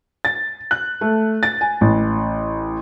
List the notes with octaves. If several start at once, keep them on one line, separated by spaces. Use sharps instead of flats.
A6
F#6
A3
A6
G#5
A1